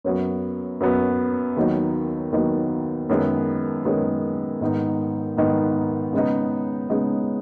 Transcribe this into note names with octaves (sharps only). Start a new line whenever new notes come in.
F#2 F#3 B3
F#2 F#3 B3
D#2 D#3 F#3 B3 D#4
D#2 D#3 F#3 B3 D#4
F#2 D#3 G#3 B3
F#2 D#3 G#3 B3
G#2 D#3 B3 D#4
G#2 D#3 B3 D#4
C#3 G#3 B3 D#4
C#3 G#3 B3 D#4